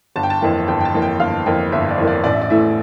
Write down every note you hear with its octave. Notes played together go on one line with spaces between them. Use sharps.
G1 A5
G5
A5
F2 E3 A#3 G5
G1 G5
G5
A5
F2 E3 A#3
G5
G1 F5
F2 E3 A#3 G5
G1 E5
D5
F2 E3 A#3
D5
A1 D5
E5
D5
A2 E3 A3 E5